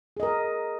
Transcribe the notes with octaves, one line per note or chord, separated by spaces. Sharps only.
G#4 A#4 D#5